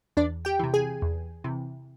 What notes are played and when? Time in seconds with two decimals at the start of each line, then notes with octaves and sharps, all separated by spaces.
0.17 E2 D4 D5
0.45 G4 G5
0.59 C3 E3
0.74 G#4 G#5
1.02 E2
1.44 C3 E3